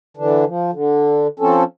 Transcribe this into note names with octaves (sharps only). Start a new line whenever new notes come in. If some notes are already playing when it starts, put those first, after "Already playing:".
D3 E3 D4
F3
D3
F3 C4 C#4 A4